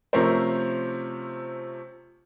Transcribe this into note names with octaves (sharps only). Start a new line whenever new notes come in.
C3 F3 A3 C#4 A#4 C5